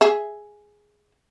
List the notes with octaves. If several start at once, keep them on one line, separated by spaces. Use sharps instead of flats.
G#4 E5